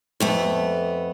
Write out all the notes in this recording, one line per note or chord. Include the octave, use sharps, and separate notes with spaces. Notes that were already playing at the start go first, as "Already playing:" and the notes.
F2 A3 B3